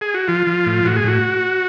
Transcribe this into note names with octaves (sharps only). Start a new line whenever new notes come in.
G#4
F#4
F3 F4
F3
A2
A2 F#4
G#4
A2 F#4